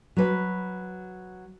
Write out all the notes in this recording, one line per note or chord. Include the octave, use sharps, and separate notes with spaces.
F#3 B4